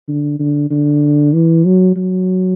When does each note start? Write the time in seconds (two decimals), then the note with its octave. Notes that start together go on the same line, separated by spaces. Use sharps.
0.08 D3
0.39 D3
0.70 D3
1.33 E3
1.65 F#3
1.96 F#3